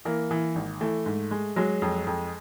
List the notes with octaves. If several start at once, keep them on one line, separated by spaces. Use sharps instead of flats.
E3 A#3
E3
G#1
E3 A3
G#2
G#3
F#3 G#3
F2
F2